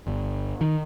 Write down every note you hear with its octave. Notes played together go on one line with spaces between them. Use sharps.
G1
D#3